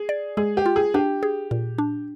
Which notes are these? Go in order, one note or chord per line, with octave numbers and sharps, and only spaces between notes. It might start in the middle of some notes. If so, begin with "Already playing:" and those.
Already playing: G#4
D5
G#3 G#4
G4
F4
G#4
D4 G4
G#4
A#2
D4